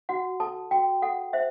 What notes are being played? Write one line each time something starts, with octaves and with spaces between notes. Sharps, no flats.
F#4 F#5
A4 A5
F#4 G5
A4 F#5
C5 E5